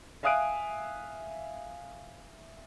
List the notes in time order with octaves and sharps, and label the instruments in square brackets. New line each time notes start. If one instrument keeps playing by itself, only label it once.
[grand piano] E5 F5 G#5 D#6 F#6 D7